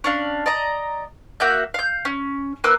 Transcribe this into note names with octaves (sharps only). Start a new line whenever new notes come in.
C#4 D4 F5
D5 D#5 A#5
A#3 F#4 E5 G6
F5 G6
C#4
A#3 B4 D6 E6